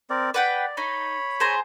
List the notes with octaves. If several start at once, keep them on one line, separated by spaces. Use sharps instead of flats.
C4 A#4 D5
B4 D5 F#5 G5
D#4 C#5 B5
G#4 C5 A#5